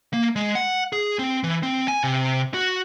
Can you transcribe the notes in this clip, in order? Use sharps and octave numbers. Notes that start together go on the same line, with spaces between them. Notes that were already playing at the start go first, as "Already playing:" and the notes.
A#3
G#3
F#5
G#4
C4
E3
C4
G#5
C3
F#4